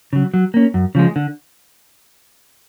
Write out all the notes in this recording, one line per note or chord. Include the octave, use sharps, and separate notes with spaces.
C#3 F#3
F#3
A#3 C#4
F#2
C#3 F3 G#3
D3